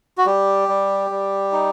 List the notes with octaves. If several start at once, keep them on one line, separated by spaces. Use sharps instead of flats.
F#4
G3 G4
G3
G3
D#4